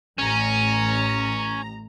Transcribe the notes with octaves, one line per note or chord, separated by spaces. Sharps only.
A1 C#4 A#5